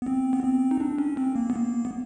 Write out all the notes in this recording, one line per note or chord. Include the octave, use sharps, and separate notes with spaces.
B3
C4
B3
C4
D#4
D4
C#4
C4
A#3
B3
A#3
B3